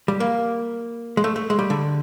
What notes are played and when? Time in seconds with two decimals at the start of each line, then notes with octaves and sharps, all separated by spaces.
0.08 G3
0.20 A#3
1.17 G#3
1.24 A3
1.36 A3
1.50 G#3
1.59 G3
1.70 D3